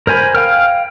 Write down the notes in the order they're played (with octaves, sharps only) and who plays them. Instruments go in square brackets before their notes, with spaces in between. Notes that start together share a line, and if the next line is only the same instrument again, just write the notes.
[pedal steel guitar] A#4 C5 G#5 B5
F5 G5 F6